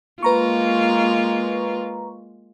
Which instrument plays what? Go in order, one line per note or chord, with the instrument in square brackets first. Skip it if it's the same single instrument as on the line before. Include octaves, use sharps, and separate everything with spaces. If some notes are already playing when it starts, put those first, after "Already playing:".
[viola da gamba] G#3 A#3 F4 [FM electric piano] B4 A#5 C#6